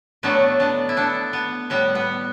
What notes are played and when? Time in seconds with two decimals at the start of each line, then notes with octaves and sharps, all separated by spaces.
0.23 A2 F#3 A3 B3 D4
0.59 B3 D4
0.89 E4
0.97 B3 D4
1.33 B3
1.70 A2 G3 B3
1.95 B3